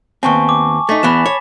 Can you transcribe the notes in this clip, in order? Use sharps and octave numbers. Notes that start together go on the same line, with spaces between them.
D#2 B3 C4 G#5 A5 C#6
D6
A3 D#4 A6 B6
E2 E3 B3 B5 E7
C#5